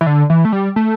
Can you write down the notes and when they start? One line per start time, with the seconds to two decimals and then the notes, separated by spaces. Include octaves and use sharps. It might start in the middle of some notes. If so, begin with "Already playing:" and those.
0.01 E3
0.07 D3
0.30 E3
0.45 A3
0.52 G3
0.76 A3